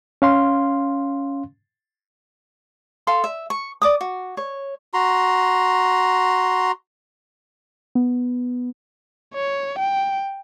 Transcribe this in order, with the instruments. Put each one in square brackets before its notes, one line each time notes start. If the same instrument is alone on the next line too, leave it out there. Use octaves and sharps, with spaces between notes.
[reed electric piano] C#4 F5 C6
[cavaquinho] A4 F5 C6
E5
C#6
D5 D6 D#6
F#4
C#5
[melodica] F#4 A#5 C6
[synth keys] B3
[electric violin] C#5
G5